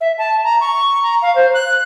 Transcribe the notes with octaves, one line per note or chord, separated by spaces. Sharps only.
E5
A5
A#5
C#6
A#5
F5
C5
F#6